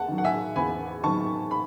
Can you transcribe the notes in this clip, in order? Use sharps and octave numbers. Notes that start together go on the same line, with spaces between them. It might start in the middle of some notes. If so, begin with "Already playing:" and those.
Already playing: E2 F#5 A5
D#3 F#3
F#5
E5 G#5
E2 G#5 B5
D#3 F#3 A5 C#6
B5